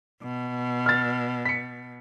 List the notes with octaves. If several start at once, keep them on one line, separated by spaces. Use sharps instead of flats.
B2
F6 A6
B6 C#7